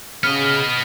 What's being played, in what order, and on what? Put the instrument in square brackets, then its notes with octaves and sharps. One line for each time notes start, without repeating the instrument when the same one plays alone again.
[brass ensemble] C#3 [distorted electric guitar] B3 D#5 [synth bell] F6